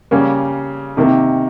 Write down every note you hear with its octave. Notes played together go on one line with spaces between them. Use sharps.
C#3 G3 A#3 C#4
C3 D#3 A#3